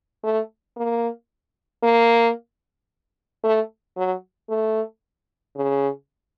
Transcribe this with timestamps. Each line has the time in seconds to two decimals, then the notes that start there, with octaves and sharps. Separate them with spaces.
0.24 A3
0.76 A#3
1.83 A#3
3.44 A3
3.97 F#3
4.50 A3
5.56 C#3